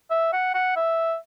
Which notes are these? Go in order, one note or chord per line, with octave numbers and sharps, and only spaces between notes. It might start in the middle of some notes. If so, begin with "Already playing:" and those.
E5
F#5
F#5
E5